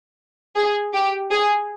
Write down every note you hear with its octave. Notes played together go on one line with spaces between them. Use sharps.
G#4
G4
G#4